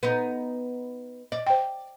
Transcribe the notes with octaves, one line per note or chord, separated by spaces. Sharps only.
B3 D#4
D5 D#5
C5 G5